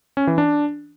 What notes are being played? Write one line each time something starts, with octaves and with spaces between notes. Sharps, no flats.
C#4
E3
D4